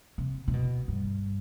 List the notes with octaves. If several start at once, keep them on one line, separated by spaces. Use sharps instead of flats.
C3
C3
B2
G2